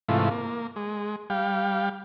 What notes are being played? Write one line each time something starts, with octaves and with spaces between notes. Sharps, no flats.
G#2 C3 E3 A3 F4
A#3
G#3
G3 F5 G5